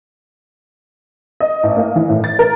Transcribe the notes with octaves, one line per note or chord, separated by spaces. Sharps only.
D#5
A1
A#3
E3
A2
A6
A#4